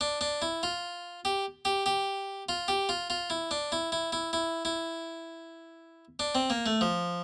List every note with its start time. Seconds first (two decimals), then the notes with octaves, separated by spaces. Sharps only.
0.01 D4
0.21 D4
0.42 E4
0.63 F4
1.25 G4
1.65 G4
1.86 G4
2.49 F4
2.68 G4
2.89 F4
3.10 F4
3.30 E4
3.51 D4
3.72 E4
3.92 E4
4.12 E4
4.33 E4
4.65 E4
6.19 D4
6.35 C4
6.50 A#3
6.66 A3
6.81 F3